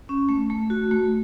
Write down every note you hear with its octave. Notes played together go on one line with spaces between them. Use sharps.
C#4
A3
A3
F#4
A3